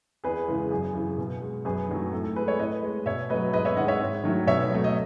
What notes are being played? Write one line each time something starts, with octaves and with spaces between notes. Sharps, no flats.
E2 G#4 B4
C#3 E3 G#3
F#2 G#4
C#3 E3
B2
G#3
F#2 G#4 B4
D#3 F#3 A3
A2 A4
A4
G#3 G#4 B4
A4 C#5
A2 B4 D#5
G#3
B2 C#5 E5
F#3 A3 B4 D#5
G#2 B4 D#5
C#5 E5
D#3 G#3 D#5 F#5
C#5 E5
G#2
D#3 F#3 A3
B2 C#5 E5
F#3 A3
D#5